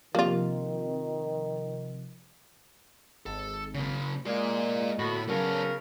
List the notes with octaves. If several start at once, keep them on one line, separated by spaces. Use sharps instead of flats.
C3 D#3 F3 A#3 F4
G#1 A4
C#3 A#3
G#3 A#3 A#4 D5
A2 D3 B3 F#4 B5
C#3 F#3 B3 C#4 A4 A#4